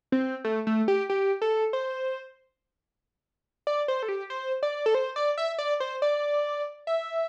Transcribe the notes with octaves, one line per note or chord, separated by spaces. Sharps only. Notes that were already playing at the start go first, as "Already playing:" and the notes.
C4
A3
A3
G4
G4
A4
C5
D5
C5
A4
G4
C5
D5
A4
C5
D5
E5
D5
C5
D5
E5